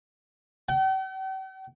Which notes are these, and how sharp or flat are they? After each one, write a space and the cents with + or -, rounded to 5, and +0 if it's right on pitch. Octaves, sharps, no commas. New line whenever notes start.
G5 -45